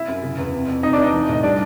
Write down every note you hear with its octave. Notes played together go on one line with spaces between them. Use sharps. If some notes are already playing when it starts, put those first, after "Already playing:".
Already playing: E4 E5
F#2
C#3
E2
C3
F2
C3 D#4 D#5
D4 D5
E2
D#4 D#5
E3
A2 D#5
G3 D4 D5